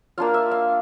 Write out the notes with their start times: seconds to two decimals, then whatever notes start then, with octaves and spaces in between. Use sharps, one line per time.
0.18 A#3 D4 F4 F5
0.34 E5
0.51 F5